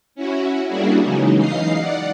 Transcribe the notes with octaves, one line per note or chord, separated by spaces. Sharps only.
C#4 E4 F#4
G3 A#3 D4 E4 F#4 G#4
C#3 E3 F#3 G#3 D#4
E3 D#4 D#5 F5 C7
D5 F#5